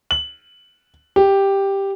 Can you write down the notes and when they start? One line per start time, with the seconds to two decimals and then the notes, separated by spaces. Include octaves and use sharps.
0.11 F#7
1.16 G4